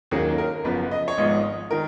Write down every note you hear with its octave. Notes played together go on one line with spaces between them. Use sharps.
D#2 D#3 F#3 A#3 C#4 G#4
A#4
F#1 F#2 F3 B3 B4
D#5
C#5
G#1 G#2 F3 B3 D#5
D#3 A#4